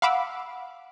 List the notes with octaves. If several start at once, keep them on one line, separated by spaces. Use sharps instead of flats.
F5 F#5 B5 D6 E6